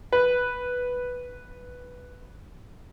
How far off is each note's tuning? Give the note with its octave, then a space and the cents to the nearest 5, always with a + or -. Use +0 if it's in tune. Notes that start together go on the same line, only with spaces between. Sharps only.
B4 +0